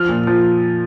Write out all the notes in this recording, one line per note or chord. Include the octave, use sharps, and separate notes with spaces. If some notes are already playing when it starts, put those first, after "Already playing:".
Already playing: F3 F6
A#2
F3